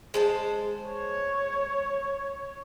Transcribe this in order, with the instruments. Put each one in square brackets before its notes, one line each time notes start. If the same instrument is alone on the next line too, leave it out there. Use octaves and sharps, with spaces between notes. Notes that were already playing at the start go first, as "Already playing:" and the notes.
[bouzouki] G#3 C5 A5
[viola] C#5